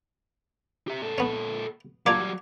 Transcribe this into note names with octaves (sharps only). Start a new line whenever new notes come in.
G4 E5
A#2 A4
B3 C#4
F#3 G3 A#3 D4 F4 D6 G#6